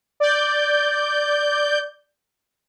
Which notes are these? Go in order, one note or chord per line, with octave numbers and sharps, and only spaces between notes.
D5 G6